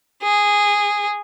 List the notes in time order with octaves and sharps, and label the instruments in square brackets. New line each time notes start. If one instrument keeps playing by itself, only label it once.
[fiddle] G#4